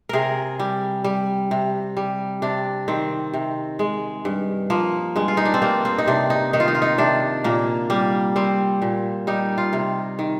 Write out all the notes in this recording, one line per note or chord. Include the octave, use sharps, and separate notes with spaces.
C3 G#4 A#4
G3
G3
C3
G3
C3 D4
D#3 C4
C3
G#3
G2
F3 A#3
G2 G#3
F4
D#4
D4
C4
G3 A#3
C4
D#4
C3 D4
D#4
D#3 D#4
F4
D#4
F4
D#4
C3 D4
A#2 A#3
G3 A#3
G3 C4
A#2
G3 D#4
F4
C3
D#3